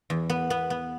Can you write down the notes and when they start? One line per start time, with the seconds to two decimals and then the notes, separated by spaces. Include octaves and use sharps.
0.10 E2
0.30 B3
0.50 B3
0.70 B3